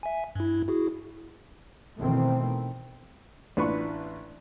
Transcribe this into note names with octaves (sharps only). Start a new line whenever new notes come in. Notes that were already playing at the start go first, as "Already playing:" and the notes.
E5 G#5
G2 E4
E4 F#4 G#4
B2 D#3 E3 A3 C4
A1 D4 F4 B4 B5 C#6